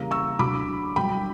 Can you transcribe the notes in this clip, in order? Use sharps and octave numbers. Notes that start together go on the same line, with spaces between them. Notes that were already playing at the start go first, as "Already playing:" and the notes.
Already playing: E2 C#3 G3 A#3 A#5
C#6 E6
D2 D3 F#3 B5 D6
G1 G2 F#3 G5 B5